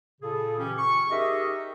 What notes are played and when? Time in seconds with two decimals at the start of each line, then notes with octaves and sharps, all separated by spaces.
0.21 A#2 C#3 G#4 A4
0.58 E3 C#4 G4
0.78 C#6
1.11 D#4 G4 G#4 A#4 D#5 E5